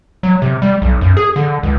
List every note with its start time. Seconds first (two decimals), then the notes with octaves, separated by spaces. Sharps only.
0.23 F#3
0.42 C3
0.62 G3
0.82 B1
1.01 F#2
1.17 G#4
1.36 D3
1.63 C#2